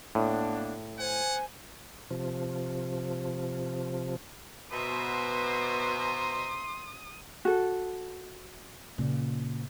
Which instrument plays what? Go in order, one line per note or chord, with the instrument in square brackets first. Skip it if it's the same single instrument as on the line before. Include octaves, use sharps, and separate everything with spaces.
[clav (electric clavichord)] A2 [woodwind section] A#3 B3 D4
[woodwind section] C5 G#5 [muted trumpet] F#5
[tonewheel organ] C3 F3
[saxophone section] B2 [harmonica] C5 E5 A#5 [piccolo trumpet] C6 [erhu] D#6
[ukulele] F#4 A4
[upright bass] A#2 C#3